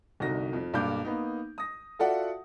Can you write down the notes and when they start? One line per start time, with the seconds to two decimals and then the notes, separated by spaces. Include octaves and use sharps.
0.20 G1 C2 D#4 F#4 A#6
0.53 F2
0.73 B1 G2 A#3 D6 G6
1.05 A#3 B3 D#4
1.58 D#6 A#6
1.99 F4 F#4 A4 D5 E5 F#5